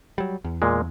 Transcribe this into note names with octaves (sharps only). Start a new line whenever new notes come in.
F#3 G3
E2
A#2 G#3